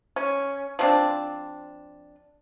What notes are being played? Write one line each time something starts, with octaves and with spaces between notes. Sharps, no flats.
C#4
F3 C4 D4